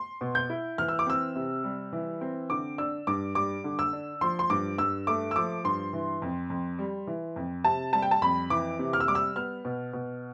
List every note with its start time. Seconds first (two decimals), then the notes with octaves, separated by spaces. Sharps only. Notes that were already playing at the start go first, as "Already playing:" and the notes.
Already playing: C6
0.21 B2
0.35 G6
0.50 E4
0.78 E3 F6
0.88 E6
0.99 D6
1.06 C4 E6
1.36 C3
1.64 G3
1.92 E3
2.21 C4
2.50 D3 D6
2.78 D4 E6
3.07 G2 D6
3.35 G3 D6
3.64 D3
3.79 E6
3.93 D4
4.21 F3 C6
4.39 C6
4.50 G2 D6
4.78 G2 E6
5.07 A3 D6
5.31 E6
5.36 F3 D6
5.64 G2 C6
5.93 E3
6.22 F2
6.50 F2
6.78 G3
7.07 E3
7.36 F2
7.64 C3 A5
7.93 G3 A5
8.02 G5
8.11 A5
8.22 F2 B5
8.50 E3 D6
8.79 C3
8.93 F6
9.00 E6
9.07 G3 D6
9.15 E6
9.36 B3 F6
9.65 B2
9.93 B2